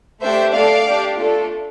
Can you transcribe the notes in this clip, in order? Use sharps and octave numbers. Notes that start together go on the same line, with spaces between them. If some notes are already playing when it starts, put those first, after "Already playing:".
A3 D4 G4 C5 E5
A3 D4 A4 D5 F5
D4 G4
A3 D4 F4 A4